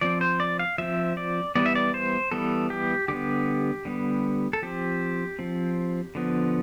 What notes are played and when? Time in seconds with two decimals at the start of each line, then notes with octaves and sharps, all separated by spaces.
0.01 F3 C4 D5
0.21 C5
0.40 D5
0.59 F5
0.78 F3 C4 E5
1.17 D5
1.55 E3 G3 B3 D5
1.66 E5
1.75 D5
1.94 C5
2.31 E3 G3 B3 A4
2.70 G4
3.08 D3 G3 B3 G4
3.85 D3 G3 B3
4.53 A4
4.62 F3 C4 G4
5.39 F3 C4
6.15 D3 F3 B3